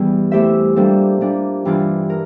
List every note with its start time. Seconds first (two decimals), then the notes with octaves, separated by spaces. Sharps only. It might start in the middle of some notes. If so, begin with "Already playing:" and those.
Already playing: E2 E3 G3
0.32 A3 E4 G4 C5 E5
0.76 A#2 G3 D4 A4 C5
1.21 A#2 G3 D4
1.65 G2 E3 G3 D4 F4
2.10 A#4